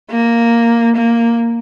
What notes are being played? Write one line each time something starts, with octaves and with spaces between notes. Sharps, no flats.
A#3
A#3